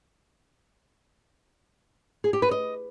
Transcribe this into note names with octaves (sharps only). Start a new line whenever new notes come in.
G#4
G4
B4
D#5